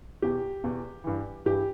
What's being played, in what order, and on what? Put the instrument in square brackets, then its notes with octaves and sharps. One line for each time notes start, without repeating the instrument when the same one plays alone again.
[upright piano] E2 B2 G4
E2 B2
G2 E3
G2 E3 G4